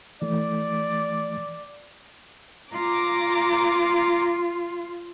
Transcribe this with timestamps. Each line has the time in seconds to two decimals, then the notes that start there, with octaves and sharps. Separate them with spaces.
0.22 E3 A3 D5
2.73 F4 A#5 D6